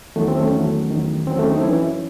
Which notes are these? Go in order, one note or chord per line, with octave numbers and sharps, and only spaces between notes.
E2 D#3 F#3 A3
C4
A3 C#4
E2 D#3 F#3
E2 D#3 F#3
E2 D#3 F#3 C4
A3 C#4
C4 D#4
F#2 E3 C#4 E4